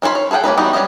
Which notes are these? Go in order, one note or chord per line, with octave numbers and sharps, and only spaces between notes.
D#3 C#4 F4 C5 B5
C#5
G#4 A4 B4 F#5 G5
A#3 C#4 D#4 B4
E3 G3 B3 D#4 F#4
G3 B3 C#4 A4 D#5